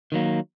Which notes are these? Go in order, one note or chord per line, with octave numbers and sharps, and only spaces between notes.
D#3 F#3 A#3